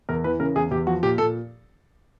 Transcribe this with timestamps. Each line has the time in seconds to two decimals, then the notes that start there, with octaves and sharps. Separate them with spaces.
0.09 E2 A#4
0.24 E3 B4
0.40 C#3 A#4
0.55 E2 G#4
0.71 E2 G4
0.87 F3 F#4
1.03 A#2 G4
1.18 A#2 A4